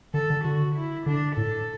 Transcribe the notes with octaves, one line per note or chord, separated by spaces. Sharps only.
D3 A4
D3
D3 F#4
E4
D3 D4
A2 A4